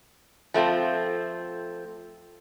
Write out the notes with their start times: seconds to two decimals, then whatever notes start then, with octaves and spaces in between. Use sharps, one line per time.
0.54 F3 A3 C4 F4